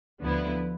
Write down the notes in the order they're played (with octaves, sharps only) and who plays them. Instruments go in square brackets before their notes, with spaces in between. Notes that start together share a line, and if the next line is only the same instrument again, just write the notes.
[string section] D2 D3 F3 B3 E4